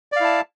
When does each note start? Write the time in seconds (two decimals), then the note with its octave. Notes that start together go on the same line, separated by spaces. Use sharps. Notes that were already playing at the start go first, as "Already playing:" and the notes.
0.12 D5
0.16 F5
0.20 E4
0.24 A5